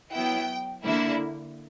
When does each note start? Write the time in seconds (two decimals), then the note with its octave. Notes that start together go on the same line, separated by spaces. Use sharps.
0.12 F#3 B3 E4 G5
0.84 D3 A#3 E4